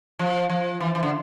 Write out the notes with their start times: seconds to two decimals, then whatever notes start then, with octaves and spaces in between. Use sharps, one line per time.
0.19 F3
0.49 F3
0.80 E3
0.95 E3
1.03 D3